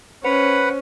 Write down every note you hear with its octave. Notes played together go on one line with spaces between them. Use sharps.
C#4 B4 C5 F#5